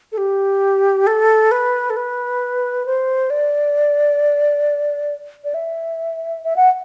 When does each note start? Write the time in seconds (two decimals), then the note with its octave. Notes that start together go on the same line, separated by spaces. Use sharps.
0.12 A4
0.18 G4
1.07 A4
1.51 B4
1.90 A4
1.97 B4
2.86 C5
3.30 D5
5.44 D5
5.54 E5
6.44 E5
6.56 F#5